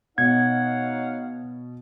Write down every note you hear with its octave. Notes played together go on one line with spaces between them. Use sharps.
B2 D#4 C#5 F5 F#5 G#6